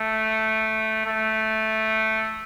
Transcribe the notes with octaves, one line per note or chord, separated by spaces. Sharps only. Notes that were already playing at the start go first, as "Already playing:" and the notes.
Already playing: A3
A3